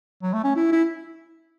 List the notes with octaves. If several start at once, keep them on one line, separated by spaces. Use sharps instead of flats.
F#3
A3
C#4
E4
E4